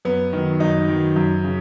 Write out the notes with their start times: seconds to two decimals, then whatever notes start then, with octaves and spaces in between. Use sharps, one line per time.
0.05 F#2 B3
0.33 D#3 F#3
0.60 F#2 D#4
0.88 D#3 F#3
1.16 F#2
1.44 C#3